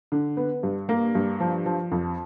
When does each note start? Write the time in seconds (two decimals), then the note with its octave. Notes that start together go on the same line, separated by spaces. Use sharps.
0.12 D3
0.37 B3
0.63 G2
0.89 A#3
1.15 G2
1.40 F3
1.66 F3
1.92 F2